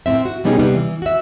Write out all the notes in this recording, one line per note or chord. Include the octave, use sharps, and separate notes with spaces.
A2 A#3 C4 E5
F#4
B2 G3 B3 C#4 D#4 G#4
C3 G3 B3 C4
E3
F#4 E5